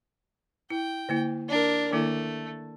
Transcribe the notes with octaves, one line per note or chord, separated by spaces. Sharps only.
E4 G5
D3 A#3 E4
D4 A#4
D#3 A3 A#3 E4